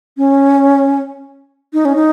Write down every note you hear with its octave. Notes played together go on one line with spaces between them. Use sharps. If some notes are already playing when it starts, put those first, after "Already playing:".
C#4
D#4
C#4
D#4